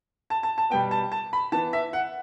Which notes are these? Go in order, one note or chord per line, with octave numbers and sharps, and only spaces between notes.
A5
A5
A5
B2 G3 B3 G5
A5
A5
B5
E3 B3 A5
E5
F#5